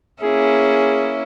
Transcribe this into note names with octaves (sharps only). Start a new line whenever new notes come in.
A#3 C#4 E4 G#4